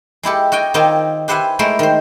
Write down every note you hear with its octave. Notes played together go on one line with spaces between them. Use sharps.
G#3 E4 G4 A4
F#4 D#5 G5 G#5
D#3 C4 D#4 F4 D5 G#5
G4 B4 C5 E5 F#5 G#5
G#3 A3 E4 A#4 C5
D#3 C5